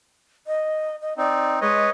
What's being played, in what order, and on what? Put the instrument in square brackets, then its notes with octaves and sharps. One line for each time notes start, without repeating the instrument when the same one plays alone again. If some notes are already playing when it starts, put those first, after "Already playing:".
[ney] D#5
D#5
[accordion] C4 D#4 [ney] D5
[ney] G#3 [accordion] B4 C#5 D#5